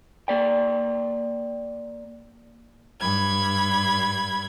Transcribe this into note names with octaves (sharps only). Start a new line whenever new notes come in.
A#3 D5 G5
G2 B5 G#6